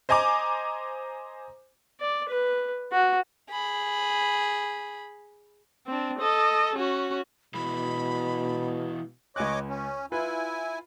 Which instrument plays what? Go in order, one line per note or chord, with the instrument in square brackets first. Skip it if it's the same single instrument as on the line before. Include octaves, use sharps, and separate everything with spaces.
[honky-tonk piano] C5 D#5 G#5 A#5 D6
[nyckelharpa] D5
B4
F#4
[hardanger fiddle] G#4 B5
[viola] C4 D4
A4 D#5
C#4 F#4
[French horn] B2 [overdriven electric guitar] E3 G#3 [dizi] B5
[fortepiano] C#2 G#5 F#6 [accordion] C#5 D#5 D6
[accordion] C#4
[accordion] E4 G#5 [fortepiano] F4 B4